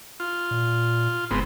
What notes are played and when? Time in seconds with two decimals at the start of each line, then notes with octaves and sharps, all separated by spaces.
0.20 F4
0.51 A#2
1.31 F#1 G#2 B3 C4